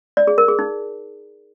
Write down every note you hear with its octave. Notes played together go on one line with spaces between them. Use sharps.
D5
G#4
A#4
G#4
D#4